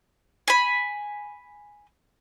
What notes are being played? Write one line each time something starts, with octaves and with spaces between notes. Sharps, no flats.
G#5 B5